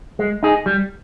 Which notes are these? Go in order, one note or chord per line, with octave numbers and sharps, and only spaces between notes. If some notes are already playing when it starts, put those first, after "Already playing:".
G#3
D#4 G#4
G3